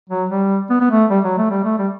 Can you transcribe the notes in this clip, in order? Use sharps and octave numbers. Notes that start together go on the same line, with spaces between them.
F#3
G3
B3
B3
A3
G3
F#3
A3
G3
A3
G3